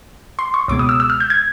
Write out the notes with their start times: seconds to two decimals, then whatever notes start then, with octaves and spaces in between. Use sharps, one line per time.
0.39 C6
0.54 C#6
0.68 C#2 B2 G#3 D6
0.79 D#6
0.89 E6
1.00 E6
1.10 F6
1.20 G6
1.30 G#6